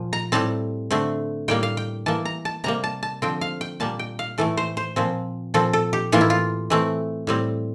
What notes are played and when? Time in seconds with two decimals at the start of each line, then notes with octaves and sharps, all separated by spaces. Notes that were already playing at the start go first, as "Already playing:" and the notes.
Already playing: A#2 F3
0.13 A#5
0.32 A2 G3 C4 A5
0.91 D3 A3 C4
1.48 A2 G3 A#3 G5
1.63 F5
1.77 G5
2.06 E3 A#3 A5
2.25 A#5
2.45 A5
2.64 C3 G3 A#3 A#5
2.84 A5
3.03 A5
3.22 D3 F3 C4 G5
3.41 F5
3.61 G5
3.80 A#2 G3 A#3 A5
3.99 G5
4.19 F5
4.38 A2 E3 A3 A4
4.57 C5
4.77 C5
4.96 A#2 F3 C4
5.54 A#2 F3 C4 A4
5.73 A4
5.93 G4
6.12 A2 E3 A#3 F4
6.21 E4
6.30 F4
6.70 E3 A3 C4
7.27 A2 G3 C4